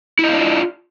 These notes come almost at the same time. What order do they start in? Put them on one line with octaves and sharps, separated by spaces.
E4 D#5 F5 D4 F4